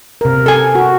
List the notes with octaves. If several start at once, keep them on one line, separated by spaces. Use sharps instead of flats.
C3 A#4
A4 G#5
F#4